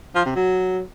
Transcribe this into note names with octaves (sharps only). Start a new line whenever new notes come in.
F3
C3
F#3